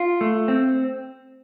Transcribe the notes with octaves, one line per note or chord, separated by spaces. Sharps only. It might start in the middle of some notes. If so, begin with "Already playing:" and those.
Already playing: F4
A3
C4